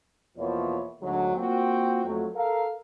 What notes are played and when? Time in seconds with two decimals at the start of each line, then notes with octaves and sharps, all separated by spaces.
0.37 E2 B2 F3 A#3 E4 C#5
1.02 D2 G#2 D3 F#3
1.36 A#3 C4 F4 F#4 G5
2.05 F2 F#3 A3
2.35 A4 A#4 F5